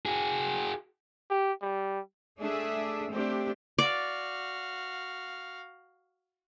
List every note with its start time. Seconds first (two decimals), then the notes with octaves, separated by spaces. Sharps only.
0.06 F#4 G#4
1.30 G4
1.62 G3
2.40 A3 D4 G#4 E5
3.11 A3 C4 D4 G4
3.78 F#4 D5 F5